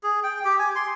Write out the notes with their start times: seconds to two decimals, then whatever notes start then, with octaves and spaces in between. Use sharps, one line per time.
0.03 G#4
0.24 G5
0.45 G4
0.59 G#5
0.75 C6